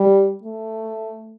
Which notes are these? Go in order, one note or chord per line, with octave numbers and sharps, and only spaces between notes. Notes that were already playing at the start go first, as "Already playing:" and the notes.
Already playing: G3
A3